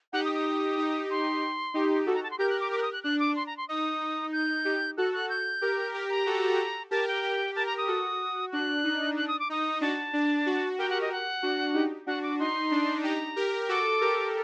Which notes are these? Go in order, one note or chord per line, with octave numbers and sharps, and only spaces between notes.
D#4 G4 F#5
D#6
D#6
D#4 G4
C6
D#4 G4
F#4 A4
A#5
A5
C6
G4 A#4 G6
F#6
D6
G4 A#4 D6
F#6
D#6
F#6
D4 F#6
D6
C6
A#5
C6
D#4 D#6
D#4
G6
D#4 G4
F#4 A4 F#6
F#6
G6
G4 A#4
G4 A#4
A#5
F#4 A4
G4 A#4 A5
G5
G4 A#4
G4 A#4 A5
A#5
D#6
F#4 A4
D4 F#4 F#6
D#4
D4 F#6
D#6
D6
D#4 D#6
D4 F#4 A5
D4
D4 F#4
G4 A#4 G5
F#5
D#5
F#5
D4 F#4
D#4 G4
D4 F#4 F#5
D6
D#4 C6
D4
D#4 G4 A#5
G4 A#4
F#4 A4 D6
G4 A#4